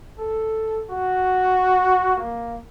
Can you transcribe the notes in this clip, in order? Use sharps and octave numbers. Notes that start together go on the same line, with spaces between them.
A4
F#4
A#3